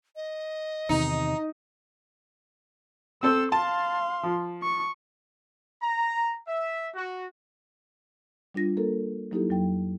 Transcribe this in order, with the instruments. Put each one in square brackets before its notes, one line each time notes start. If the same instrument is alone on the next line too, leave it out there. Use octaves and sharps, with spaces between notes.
[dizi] D#5
[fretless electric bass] E2 C3 D#3 [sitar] D#4
[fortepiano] C4 A4 C5 [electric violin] E6
[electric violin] F5 C6 [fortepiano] A5
[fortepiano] F3
[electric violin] C#6
[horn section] A#5
E5
F#4
[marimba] G3 D4 F4 A#6
A#3 A4 A#4
F#3 A#3 D#4 E4 G4 A4
F2 F#3 G5